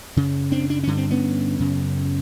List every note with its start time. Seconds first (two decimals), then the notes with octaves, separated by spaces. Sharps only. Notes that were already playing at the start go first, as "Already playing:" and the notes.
0.16 F#2 C#3
0.52 C4 D4
0.70 D4
0.83 G2 D3 C#4
0.97 C4
1.11 B3 C#4
1.59 F#2 C#3